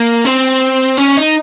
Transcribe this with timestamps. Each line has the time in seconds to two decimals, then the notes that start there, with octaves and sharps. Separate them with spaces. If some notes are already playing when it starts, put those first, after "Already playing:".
Already playing: A#3
0.25 C4
0.98 C#4
1.18 D#4